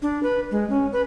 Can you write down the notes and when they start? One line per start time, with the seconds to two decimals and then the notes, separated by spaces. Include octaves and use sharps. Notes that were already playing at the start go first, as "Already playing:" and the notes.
0.02 D4
0.23 B4
0.51 G#3
0.70 C#4
0.93 B4